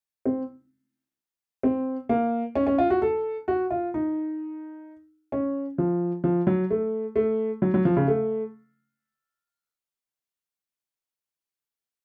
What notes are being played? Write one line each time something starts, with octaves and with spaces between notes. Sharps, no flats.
C4
C4
A#3
C#4
C#4
F4
F#4
A4
F#4
F4
D#4
C#4
F3
F3
F#3
A3
A3
F#3
F#3
F3
C#3
A3